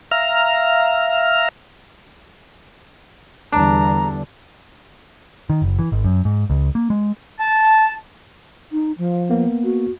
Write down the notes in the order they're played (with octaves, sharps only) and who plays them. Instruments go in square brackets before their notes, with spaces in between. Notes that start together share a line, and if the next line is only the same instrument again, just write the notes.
[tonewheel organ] E5 F5 A#5 F6
[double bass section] E2 D3 G3 [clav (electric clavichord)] D4 [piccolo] A#5
[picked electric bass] D#3
F#1
E3
G#1
F#2
G#2
C#2
A#3
G#3
[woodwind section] A5
[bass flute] D#4
F3
[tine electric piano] A#3 B3
[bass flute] F#4